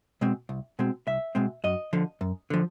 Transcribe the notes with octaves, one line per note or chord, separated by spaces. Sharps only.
B2 G#3 C4
C2
B2 G#3 C4
C2 E5
B2 G#3 C4
F#2 D#5
D3 F3
F#2
D3 F3